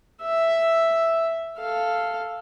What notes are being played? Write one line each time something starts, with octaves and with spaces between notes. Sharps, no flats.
E5
A4 F5